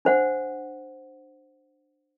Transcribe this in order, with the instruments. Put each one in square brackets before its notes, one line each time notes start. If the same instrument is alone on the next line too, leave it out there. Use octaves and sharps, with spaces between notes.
[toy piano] D4 C5 F#5